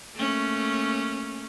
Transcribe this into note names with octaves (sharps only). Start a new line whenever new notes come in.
A3 A#3 C#4